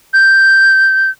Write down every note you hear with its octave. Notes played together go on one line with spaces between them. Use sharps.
G6